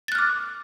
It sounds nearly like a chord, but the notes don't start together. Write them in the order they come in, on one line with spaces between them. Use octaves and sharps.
A6 F#6 F6 D6